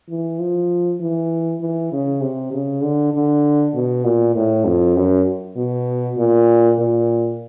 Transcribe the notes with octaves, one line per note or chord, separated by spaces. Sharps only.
E3
F3
E3
E3
C#3
C3
C#3
D3
D3
B2
A#2
A2
F2
F#2
B2
A#2
A#2